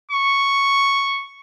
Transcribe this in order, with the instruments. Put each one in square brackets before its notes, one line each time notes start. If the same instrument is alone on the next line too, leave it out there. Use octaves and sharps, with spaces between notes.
[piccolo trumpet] C#6